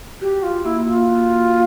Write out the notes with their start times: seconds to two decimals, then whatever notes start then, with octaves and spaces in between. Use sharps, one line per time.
0.21 F#4 G4
0.43 F4
0.65 A#3 E4
0.87 F4
1.09 F#4